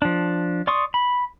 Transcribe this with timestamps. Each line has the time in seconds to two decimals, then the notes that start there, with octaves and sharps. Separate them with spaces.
0.02 F3 D4
0.67 D5 C6 C#6 D#6
0.94 B5